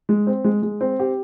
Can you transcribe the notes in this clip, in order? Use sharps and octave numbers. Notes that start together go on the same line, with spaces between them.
G#3
C4
G#3
G#3
C4
G4